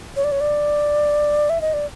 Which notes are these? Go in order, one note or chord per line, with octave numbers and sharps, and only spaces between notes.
C#5
D5
C#5
D5
E5
D#5
D5